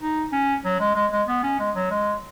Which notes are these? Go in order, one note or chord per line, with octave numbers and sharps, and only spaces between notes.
D#4
C#4
F#3
G#3
G#3
G#3
B3
C#4
G#3
F#3
G#3